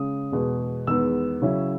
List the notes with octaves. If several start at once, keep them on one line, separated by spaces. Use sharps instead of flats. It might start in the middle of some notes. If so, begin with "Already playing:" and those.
Already playing: C#3 G#3 C#4 D#6
E2 B2 G#3 B3
E2 D#3 G#3 B3 E6
C#3 F#3 C#4 E4